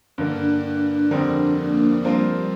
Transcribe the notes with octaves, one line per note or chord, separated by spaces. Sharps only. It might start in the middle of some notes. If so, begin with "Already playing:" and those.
G2 D3 A#3 D4
F2 D3 G3 C4 A#4
A#3
F3 G3 C4 F4 A#4